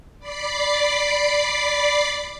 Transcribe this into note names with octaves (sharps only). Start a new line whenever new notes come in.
D5 B5 D6 C7